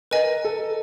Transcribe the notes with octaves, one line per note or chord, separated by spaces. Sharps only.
A#4 B4 D#5 G#5
A4